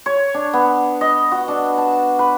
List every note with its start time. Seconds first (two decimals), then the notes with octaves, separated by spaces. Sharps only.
0.06 C#5
0.34 D4
0.53 B3
1.01 D#5
1.32 F#4
1.48 D4
1.78 A5
2.19 B4